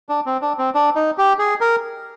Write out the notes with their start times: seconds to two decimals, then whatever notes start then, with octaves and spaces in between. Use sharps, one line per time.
0.09 D4
0.26 C4
0.41 D4
0.58 C4
0.74 D4
0.95 D#4
1.18 G4
1.39 G#4
1.61 A#4